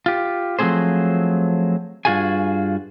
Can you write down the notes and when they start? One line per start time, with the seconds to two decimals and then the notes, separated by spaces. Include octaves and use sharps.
0.06 F4 G4
0.59 F3 F#3 A3 C4 G#4 C5
2.05 G2 C#3 F4 F#4 G#4 G#5